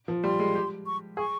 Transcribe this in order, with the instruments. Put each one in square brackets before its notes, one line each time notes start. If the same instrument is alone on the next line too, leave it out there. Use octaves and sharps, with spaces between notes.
[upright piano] F3
[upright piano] G3 [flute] C6
[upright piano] G#3
G4
[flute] C#6
[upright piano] G#4 [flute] C#6